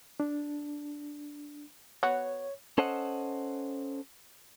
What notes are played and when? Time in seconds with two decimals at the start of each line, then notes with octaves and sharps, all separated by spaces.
0.20 D4
2.03 B3 F#4 C#5
2.78 C#4 A4 C5 D#5 F#5